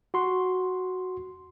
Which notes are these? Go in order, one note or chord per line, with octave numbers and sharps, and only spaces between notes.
F#4 C6